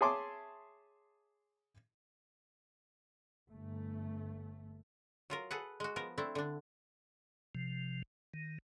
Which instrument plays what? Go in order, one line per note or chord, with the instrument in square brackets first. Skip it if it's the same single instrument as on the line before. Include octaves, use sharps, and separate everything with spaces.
[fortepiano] G#4 C#5 E5 A5 C6 D6
[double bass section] G1 A3
[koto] F#3 F4 A#4
G#4 A4 B4 F#5
G#3 F#4
F3 B3 A#4
A3 C4 D4 E4
D3 D4
[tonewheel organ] C3 F3
D#3